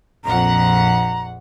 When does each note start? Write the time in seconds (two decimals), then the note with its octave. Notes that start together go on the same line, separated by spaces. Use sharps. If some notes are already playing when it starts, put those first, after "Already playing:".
0.24 A#1 F2 F#5 A#5